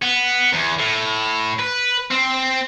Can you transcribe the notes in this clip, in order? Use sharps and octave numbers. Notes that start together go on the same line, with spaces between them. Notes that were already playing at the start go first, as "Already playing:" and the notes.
B3
E2
A2
B4
C4